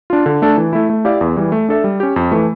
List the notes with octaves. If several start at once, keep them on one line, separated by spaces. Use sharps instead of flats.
D4 F4
D3
A3 D4 A4
E3
A3 E4
A3
E4 G4 D5 F5
E2
E3 G3
A3
D4 A4 E5
G3
C#4 G4
F2
E3 A3